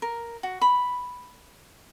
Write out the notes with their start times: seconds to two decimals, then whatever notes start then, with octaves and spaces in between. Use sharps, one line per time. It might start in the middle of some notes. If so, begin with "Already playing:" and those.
0.02 A#4
0.43 F#4
0.61 B5